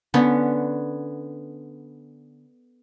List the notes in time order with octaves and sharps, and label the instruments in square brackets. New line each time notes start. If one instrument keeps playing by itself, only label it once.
[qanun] D3 B3 C#4